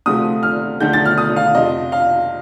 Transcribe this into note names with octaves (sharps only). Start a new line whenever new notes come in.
D2 C3 F3 A3 C4 D#6
F6
D2 D3 F3 A3 D#4 G6
A6
F6
D#6
F5
F2 C3 F3 D#5
F5